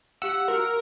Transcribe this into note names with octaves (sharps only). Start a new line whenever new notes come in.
G4 F5 F#5 E6
F#4 A#4 A#5 C6